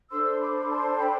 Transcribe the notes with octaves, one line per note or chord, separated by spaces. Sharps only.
D4 A4 C5 C6 E6
B5 D6
A5 C6
G5 B5